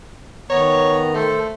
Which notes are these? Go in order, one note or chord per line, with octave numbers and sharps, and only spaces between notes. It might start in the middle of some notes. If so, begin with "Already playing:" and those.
D#3 B3 C#5 A#5
A3 A4 C5